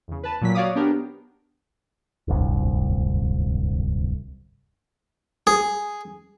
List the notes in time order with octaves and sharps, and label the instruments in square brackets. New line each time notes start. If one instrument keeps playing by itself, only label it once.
[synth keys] E2 C#3
B4 A5
A#2 F#3 B6
F#4 C#5 D5 F5 D6 D#6
B3 D4 G4 A#4
[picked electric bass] D1 G1 C2
[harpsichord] G#4